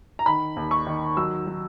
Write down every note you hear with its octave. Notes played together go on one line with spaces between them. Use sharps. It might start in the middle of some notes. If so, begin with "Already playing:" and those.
A#5
D#3 B5
D#2
C#6
D#3
F#3 E6
F#3